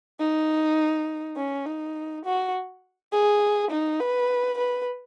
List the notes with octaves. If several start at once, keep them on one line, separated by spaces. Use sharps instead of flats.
D#4
C#4
D#4
F#4
G#4
D#4
B4
B4